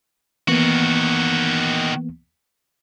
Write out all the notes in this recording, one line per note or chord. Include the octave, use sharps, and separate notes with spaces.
D#3 E3 A#3 B3 F#4